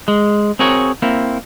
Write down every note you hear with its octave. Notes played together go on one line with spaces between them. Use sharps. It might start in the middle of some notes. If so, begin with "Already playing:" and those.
G#3
C4 F#4 G#4 A#4 C#5
A#3 C4 E4